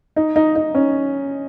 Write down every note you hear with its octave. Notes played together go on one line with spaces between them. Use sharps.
D#4
D#4
D#4
C#4